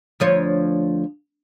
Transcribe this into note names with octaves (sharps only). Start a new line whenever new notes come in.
D2 F3 C#5